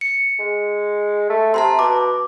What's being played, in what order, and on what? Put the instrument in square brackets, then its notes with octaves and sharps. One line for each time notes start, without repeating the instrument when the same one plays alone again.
[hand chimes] C#7
[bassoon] G#3
A3
[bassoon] C3 [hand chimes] A5 A#5 C6
[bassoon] B2 [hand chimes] D6